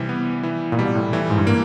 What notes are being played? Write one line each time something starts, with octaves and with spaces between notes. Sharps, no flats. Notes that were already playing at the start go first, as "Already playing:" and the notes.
Already playing: C3 E3 G3
B3
E3
A#2
B2 G3
A2
A2 E3
G#2
G2
A#3